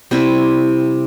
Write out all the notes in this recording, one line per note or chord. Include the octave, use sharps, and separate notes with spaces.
C3 G3 C4 E4